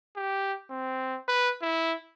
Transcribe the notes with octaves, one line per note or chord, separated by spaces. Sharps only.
G4
C4
B4
E4